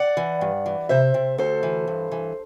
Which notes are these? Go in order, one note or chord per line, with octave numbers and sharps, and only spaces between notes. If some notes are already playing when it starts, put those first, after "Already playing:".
Already playing: D5 F#5
E3
G2
E3
C3 C5 E5
C3
D2 A4 C5
E3
G2
E3